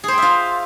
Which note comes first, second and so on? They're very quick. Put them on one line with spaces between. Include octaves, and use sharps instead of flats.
G#4 C5 G5 E5 F4